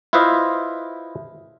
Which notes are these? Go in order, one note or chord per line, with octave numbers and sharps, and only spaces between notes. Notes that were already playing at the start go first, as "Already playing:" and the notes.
E4 F4 B4 C5 D#5 E5